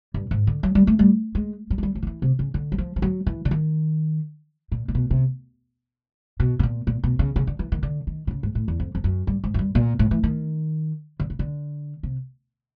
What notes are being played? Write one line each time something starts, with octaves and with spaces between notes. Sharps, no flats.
G2
G#2
D3
F#3
G3
A3
G3
G#3
F#3
G#3
G3
F#3
D#3
E3
C3
C#3
D3
F#3
F3
F3
F#3
E3
D3
D#3
A#2
A#2
B2
C3
B2
B2
A#2
A#2
B2
C#3
C#3
D3
E3
D#3
D3
D#3
D3
C#3
G#2
A2
E2
F2
F2
F#2
G2
G#2
F#2
G2
A#2
A2
E3
D#3
D3
C#3
D3
C3